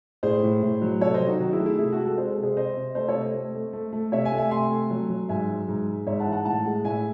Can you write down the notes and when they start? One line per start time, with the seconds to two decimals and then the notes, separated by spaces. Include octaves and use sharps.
0.23 A2 G#4 C5
0.43 A2
0.62 A2
0.82 F#3
1.01 C3 A4 C#5
1.14 C5 D#5
1.20 F#3
1.27 D#4 F#4
1.40 D#3 D#4 F#4
1.53 E4 G#4
1.60 A3
1.66 E4 G#4
1.78 C3 E4 G#4
1.92 F#4 A4
1.99 G#3
2.05 F#4 A4
2.18 G#3 C5
2.31 A4
2.37 C3
2.43 G#4 C5
2.57 C3 C5 D#5
2.77 C3
2.95 A3 C5 D#5
3.08 A4 C#5
3.15 C3
3.21 C5 D#5
3.35 A3
3.55 A3
3.73 A3
3.93 A3
4.12 C3 C#5 E5
4.25 E5 G#5
4.32 A3
4.38 E5 G#5
4.51 C3 G#5 C6
4.70 A3
4.90 F#3
5.10 F#3
5.29 G#2 E5 G#5
5.49 F#3
5.68 G#2
5.87 G#2
6.07 G#2 C#5 E5
6.20 F#5 A5
6.26 E3
6.32 F#5 A5
6.45 A2 F#5 A5
6.66 G#3
6.84 A2 E5 G#5